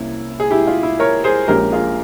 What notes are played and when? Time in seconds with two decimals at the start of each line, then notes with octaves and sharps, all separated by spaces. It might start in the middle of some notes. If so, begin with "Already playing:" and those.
Already playing: C2 C3 A#3 C#4 E4
0.40 G#4
0.51 E4 G4
0.67 F4
0.83 E4
1.00 A#4 C#5
1.24 G#4 C5
1.48 A#1 A#2 G#3 C#4 G4 A#4
1.72 F4 G#4